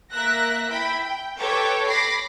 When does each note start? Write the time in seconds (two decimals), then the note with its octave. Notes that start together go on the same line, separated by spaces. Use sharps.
0.13 A#3 A#4 E5 F#6 A#6
0.67 E4 E5 G5 B5
1.02 G5
1.38 G4 A4 B4 C#5 G5 D6
1.87 B5 D6 A#6 C7